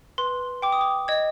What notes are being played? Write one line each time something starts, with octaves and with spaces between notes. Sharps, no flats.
B4 C6
G5 D6
D#6
D6
D#5 G#6